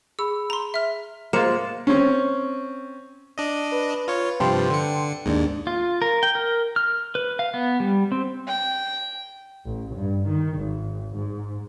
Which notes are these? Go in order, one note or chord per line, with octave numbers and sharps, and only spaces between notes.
G#4 B5 E6
A#5 C6
E5 F6
G#3 A#3 F4 C5 C#7 E7
C4 C#4
D4 D#5
B4
F4 C#5
G2 C3 F3 G5 A5 C6
D3 C#7
D#2 G#2 G#3 A#3 D4
F4
A#4
G5
A#4
F6
B4
F5
B3
G3
C4
G5
A1
G2
D#3
G#1
G#2